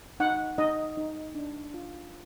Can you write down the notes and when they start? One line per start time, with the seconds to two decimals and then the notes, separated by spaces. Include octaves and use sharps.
0.20 D#4 F#5
0.58 D#4 D#5
0.97 D#4
1.35 D4
1.74 F4